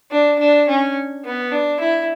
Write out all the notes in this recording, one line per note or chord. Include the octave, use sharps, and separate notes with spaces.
D4
D4
C#4
B3
D4
E4